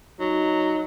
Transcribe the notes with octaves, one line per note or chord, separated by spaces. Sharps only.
F#3 D#4